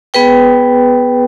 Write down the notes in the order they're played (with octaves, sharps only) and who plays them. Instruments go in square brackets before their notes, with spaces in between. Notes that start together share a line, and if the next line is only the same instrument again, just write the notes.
[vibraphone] B3 G#4 B4 G5